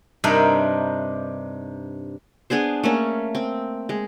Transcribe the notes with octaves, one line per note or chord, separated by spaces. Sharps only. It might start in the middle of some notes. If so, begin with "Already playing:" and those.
G2 C3 D4 D#4 A#4 E5
B3 D4 G#4 C5
A3 A#3 C#4
C4
G#3